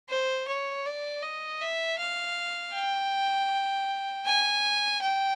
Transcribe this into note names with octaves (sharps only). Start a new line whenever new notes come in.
C5
C#5
D5
D#5
E5
F5
G5
G#5
G5